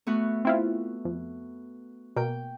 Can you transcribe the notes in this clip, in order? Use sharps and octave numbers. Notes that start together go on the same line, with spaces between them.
A3 B3 F#4
C4 E4 F4
F2
B2 A#3 G5